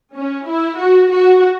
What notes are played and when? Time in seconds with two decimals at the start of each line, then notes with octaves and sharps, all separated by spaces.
0.14 C#4
0.46 E4
0.78 F#4
1.10 F#4